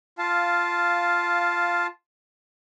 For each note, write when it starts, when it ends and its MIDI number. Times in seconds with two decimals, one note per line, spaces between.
0.18 1.87 65
0.18 1.87 77
0.18 1.87 81